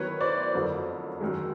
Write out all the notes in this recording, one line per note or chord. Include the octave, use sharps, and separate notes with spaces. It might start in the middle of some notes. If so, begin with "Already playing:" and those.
Already playing: D#3 F#3 B3 E4 B4 C#5
C5 D5
F2 D3 F#3 A#3
F#2 D#3 G#3